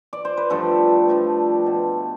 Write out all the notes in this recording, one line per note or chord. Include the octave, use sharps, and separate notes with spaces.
D5
C5
B4
G2 F3 A3 A4
G2 F3 A3
B2 A3